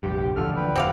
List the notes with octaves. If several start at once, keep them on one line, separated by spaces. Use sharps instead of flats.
F1 A#1 G2 G4
A1 D#2 D3 F3 A4 F6
B4 G5
G1 F2 F3 C4 G4 F5 F#5